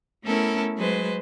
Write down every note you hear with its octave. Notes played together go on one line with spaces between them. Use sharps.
A3 B3 C#4 E4 A4 A#4
F#3 G#3 B4 C5